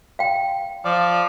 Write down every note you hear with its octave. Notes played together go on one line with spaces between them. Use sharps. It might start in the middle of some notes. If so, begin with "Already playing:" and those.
F5 G5
F3 D5